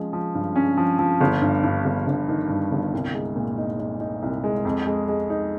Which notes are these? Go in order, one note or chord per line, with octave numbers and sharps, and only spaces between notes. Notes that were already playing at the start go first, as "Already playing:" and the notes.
Already playing: F3 G#3 C#4
F3
G2
C#4
F3
F3
G1
G2
G2
G1
G1
D#3
G2
G1
C2
G#3
A#2
D#4
D#4
D#4
C2
G#3
F2
G#3
G#3
D#4